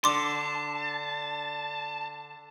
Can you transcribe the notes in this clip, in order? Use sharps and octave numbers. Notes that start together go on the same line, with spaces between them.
D3 A5 C6 D6